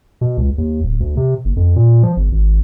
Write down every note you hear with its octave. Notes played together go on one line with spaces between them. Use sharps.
B2
C#2
D#2
D1
D2
C3
F#1
F2
A#2
F3
G1
G#1